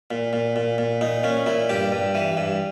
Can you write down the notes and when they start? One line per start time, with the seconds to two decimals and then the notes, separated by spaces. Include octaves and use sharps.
0.11 A#2
0.33 A#2
0.56 A#2
0.78 A#2
1.01 A#2 D#4
1.23 A#2 C#4
1.46 A#2 E4
1.69 G2 G4
1.92 G2
2.15 E3
2.37 G2